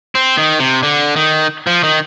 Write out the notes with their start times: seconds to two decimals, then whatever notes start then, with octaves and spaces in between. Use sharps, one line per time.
0.15 C4
0.37 D#3
0.60 C3
0.83 D3
1.16 D#3
1.67 F3
1.83 D#3